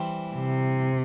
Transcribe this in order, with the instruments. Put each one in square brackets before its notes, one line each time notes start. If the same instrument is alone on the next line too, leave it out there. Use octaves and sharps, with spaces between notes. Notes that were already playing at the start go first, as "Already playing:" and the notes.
Already playing: [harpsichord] E3 G3 C4 E4
[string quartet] C3